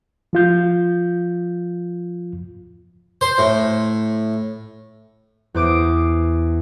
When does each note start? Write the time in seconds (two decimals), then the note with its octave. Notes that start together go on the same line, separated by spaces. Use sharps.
0.33 F3 F4 G6
3.21 C5
3.38 A2
5.54 E2 C5 D6 D#6 D7